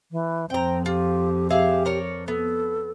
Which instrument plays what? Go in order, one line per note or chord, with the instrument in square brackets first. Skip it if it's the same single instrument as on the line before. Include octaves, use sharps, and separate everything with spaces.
[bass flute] E3
[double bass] F2 [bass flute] C4 [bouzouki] G5 A#5
[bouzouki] F4 [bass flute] G4
[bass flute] G4 [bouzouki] G#4 E5 F5
[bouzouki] D4 A#4 C#5
[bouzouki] B3 [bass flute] A4